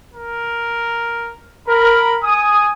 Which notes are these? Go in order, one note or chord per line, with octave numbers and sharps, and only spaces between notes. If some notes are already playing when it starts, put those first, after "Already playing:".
A#4
A#4 B5
G#5 D#6